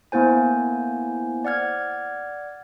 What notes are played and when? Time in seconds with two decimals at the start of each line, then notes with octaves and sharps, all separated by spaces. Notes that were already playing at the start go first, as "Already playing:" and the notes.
0.12 A#3 B3 E4 C5 G#5
1.45 D5 F#5 F6 G#6